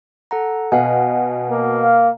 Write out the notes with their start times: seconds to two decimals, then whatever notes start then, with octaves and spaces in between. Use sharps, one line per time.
0.31 A4 F#5 A#5
0.72 B2 F5 F#5 G#5
1.50 A#3
1.82 F5